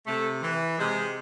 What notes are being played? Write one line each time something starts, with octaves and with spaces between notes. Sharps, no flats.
C3 A3
E3
C3 G#3